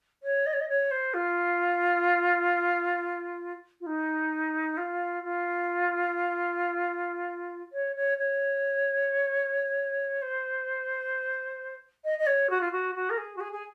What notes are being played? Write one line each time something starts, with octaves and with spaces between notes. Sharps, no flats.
C#5
D#5
C#5
D#5
C#5
C5
F4
F4
D#4
F4
F4
C#5
C#5
C#5
C5
D#5
D#5
C#5
F#4
F4
F#4
F#4
A#4
G#4
F#4
G#4
G#4